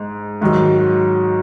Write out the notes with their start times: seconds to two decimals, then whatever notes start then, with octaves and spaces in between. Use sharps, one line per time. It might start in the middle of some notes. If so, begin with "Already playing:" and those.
Already playing: G#2 G#3
0.41 G#2 D#3 F#3